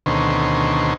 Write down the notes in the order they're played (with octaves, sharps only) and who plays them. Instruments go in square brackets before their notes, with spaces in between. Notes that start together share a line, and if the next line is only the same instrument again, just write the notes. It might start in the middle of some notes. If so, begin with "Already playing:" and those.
[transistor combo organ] D2 B2 D#3 C#4 C5